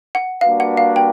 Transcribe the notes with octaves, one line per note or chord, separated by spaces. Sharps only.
F#5
G3 A#3 D4 F#4 B4 F5
F#5
F5
G5